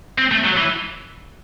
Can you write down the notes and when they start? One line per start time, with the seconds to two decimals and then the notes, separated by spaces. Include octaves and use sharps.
0.18 C4
0.31 A3
0.44 F#3
0.57 E3